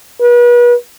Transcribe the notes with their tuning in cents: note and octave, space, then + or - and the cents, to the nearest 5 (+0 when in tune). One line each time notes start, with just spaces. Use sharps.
B4 -40